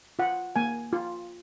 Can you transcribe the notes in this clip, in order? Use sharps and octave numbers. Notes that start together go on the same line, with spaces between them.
F4 F#5
A#3 G#5
F4